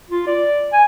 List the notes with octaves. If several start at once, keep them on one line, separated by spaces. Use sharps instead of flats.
F4
D5
G#5